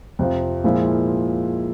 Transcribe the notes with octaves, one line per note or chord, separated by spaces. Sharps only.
F2 C3 F3
A#2 F3 G#3 E4